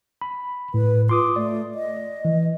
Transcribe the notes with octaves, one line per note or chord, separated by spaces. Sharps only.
B5
A2 B4
F4 C6 D6 D#6
A3 D5
D#5
E3